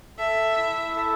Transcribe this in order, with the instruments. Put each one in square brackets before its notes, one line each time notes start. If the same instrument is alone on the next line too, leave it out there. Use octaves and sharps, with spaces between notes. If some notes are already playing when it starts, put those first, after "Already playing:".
[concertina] A4 [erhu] E5
[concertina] E4
A4